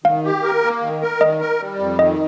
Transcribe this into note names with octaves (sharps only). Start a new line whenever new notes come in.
D#3 F5
G4
A#4
A#3
D#3
A#4
D#3 D#5
A#4
G3
F2
D#3 D#5